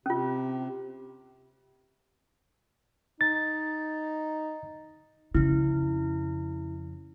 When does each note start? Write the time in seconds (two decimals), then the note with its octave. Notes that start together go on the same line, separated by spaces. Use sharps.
0.06 C3 C#4 F4
3.21 D#4 A6
5.35 F2 C#3 E4